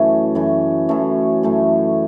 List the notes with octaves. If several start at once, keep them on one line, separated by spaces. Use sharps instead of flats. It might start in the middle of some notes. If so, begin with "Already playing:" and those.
Already playing: F#2 E3 A3 C#4
F#2 E3 A3 C#4
F#2 E3 A3 C#4
F#2 E3 A3 C#4